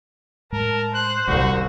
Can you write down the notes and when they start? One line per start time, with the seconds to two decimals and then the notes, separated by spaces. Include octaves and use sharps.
0.52 A2 G#3 A#4 A5
0.94 C5 F#6
1.28 D#1 C2 C3 G3 F#4